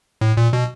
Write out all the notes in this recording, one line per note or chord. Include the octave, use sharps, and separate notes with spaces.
A2
A#2
B2